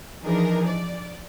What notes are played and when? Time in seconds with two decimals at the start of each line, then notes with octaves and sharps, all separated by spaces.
0.23 E3 F3 D4 D#4 G#4 A#4
0.65 D5